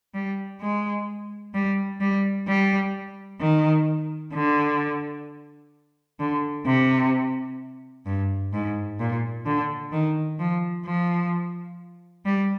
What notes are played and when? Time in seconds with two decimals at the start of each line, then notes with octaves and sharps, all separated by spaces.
0.14 G3
0.61 G#3
1.54 G3
2.00 G3
2.48 G3
3.40 D#3
4.34 D3
6.20 D3
6.66 C3
8.06 G2
8.53 G#2
9.00 A#2
9.46 D3
9.92 D#3
10.39 F3
10.86 F3
12.25 G3